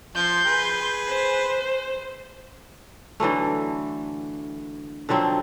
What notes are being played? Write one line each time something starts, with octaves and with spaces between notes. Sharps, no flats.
F3 C6 G6
G#4 B4
C5
D3 E3 F#3 A3
D3 F3 F#3 C4